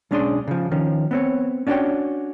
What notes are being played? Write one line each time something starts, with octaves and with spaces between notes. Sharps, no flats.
B1 G#3 C#4 D4 G#4 C6
C#3 F3
D#3 F3 C#4
B3 C4 C#5
C#4 D4 F#4 G4 C#5 G5